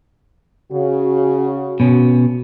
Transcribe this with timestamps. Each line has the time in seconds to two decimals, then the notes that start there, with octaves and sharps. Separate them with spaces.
0.72 C#3 F#4
1.80 B2 C#4